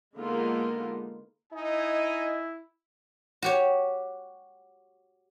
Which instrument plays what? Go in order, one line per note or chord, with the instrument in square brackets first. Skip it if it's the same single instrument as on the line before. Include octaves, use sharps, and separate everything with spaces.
[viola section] D3 G#3 A#3 B3 D#4 F4
[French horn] D#4 [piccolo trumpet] E4 [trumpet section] D#5 G#5
[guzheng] F#4 G4 C#5